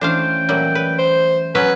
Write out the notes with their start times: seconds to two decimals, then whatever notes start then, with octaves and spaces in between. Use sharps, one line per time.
0.01 E3 A3 C#4 D4 C5 F5 G5
0.49 A#2 F#3 G3 E5
0.75 B4
0.99 C5
1.55 F#3 C#4 B4 G#5